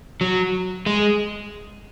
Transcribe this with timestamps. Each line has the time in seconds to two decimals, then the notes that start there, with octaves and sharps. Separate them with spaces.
0.21 F#3
0.86 G#3